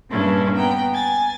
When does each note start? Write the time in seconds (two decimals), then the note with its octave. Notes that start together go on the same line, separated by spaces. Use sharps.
0.12 G2 A#2 C#3 C#4 D4 E4
0.56 B3 G5 A#5
0.93 G#5 A6